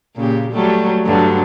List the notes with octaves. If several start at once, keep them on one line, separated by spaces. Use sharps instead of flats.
A#2 C#3 G4
F#3 G3 A3
G2 D3 F#3